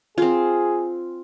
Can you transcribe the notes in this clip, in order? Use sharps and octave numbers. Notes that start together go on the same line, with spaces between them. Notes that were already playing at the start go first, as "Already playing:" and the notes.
C4 F4 G#4